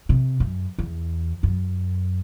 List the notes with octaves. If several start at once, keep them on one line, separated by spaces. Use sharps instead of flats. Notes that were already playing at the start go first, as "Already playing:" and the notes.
C3
F#2
E2
F#2